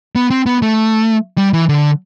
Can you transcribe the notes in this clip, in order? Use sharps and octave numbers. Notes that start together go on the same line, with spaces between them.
B3
C4
B3
A3
G3
E3
D3